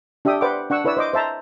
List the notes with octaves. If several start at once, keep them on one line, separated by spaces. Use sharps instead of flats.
D4 G4 E5 G5 D#6
B4 C5 D5 F#5 G5 D6
D4 F#5 C#6 E6
E4 B4 C#5 D5 E6
C5 D#5 D6
C5 E5 A5 A#5